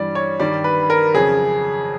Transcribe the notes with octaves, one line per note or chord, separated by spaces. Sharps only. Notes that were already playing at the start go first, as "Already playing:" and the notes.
Already playing: G2 E3 G3 D5
C#5
G2 D#3 G3 D5
B4
A#4
F2 C#3 F#3 G#4